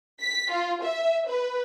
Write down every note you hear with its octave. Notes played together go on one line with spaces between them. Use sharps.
B6
F4
E5
B4